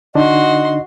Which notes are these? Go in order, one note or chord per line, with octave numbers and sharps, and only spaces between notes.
D3 D4 D#4 F#4 D#5 C6